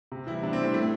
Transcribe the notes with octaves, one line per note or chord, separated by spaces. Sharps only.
C3
E3 G3 E4
C3 D4
C4
E3 G3 A3
A2 A3